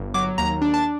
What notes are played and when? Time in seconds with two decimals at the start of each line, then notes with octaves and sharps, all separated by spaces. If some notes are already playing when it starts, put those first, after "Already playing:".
Already playing: G1
0.14 F#3 D6
0.38 D#2 A#5
0.62 D4
0.74 A5